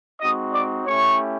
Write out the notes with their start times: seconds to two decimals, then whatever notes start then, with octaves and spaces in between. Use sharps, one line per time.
0.21 G#3 C4 D#4 F#4 D#5 D#6
0.53 D5 D6
0.86 A3 C#4 E4 G4 C#5 C#6